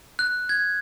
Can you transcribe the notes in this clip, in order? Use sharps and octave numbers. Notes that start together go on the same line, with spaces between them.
F#6
G#6